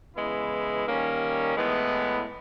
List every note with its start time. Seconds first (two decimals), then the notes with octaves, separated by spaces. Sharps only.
0.15 C#3 E3 G#3 B3 E4
0.86 D#3 G3 A#3 C#4
1.55 A2 E3 G#3 B3